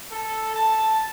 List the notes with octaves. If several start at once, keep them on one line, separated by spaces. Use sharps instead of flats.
A4
A5